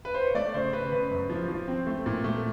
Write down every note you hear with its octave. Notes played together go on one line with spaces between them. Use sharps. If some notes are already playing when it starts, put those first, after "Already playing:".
B4
C5
C#5
A3 D5
C#3 C5
C#3 B4
C#3 B4
F#2
F3
F3
C4
A3
A#2
A3